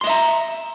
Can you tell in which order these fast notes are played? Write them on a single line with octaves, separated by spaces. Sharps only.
C6 D#5 E5 A#5